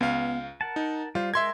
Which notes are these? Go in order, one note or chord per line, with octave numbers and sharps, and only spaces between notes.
C#2 B3 F5
A#4 F#5 A5
D#4
G3 F4 C5
G#3 A#4 E5 C6 G#6